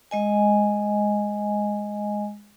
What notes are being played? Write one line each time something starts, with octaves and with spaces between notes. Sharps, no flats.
G#3 D#5 G#5